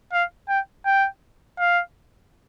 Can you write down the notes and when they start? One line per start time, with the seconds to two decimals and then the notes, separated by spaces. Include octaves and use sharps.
0.13 F5
0.49 G5
0.86 G5
1.59 F5